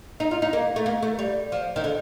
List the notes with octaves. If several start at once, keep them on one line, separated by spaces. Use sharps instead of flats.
D#4
F4
D#4
A#3
A3
A#3
A3
G3
F3
D#3
D3